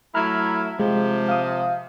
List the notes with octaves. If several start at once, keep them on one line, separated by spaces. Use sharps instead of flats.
F#3 A3 E4 A#5 F6
C3 F3 G#3
F5 D#6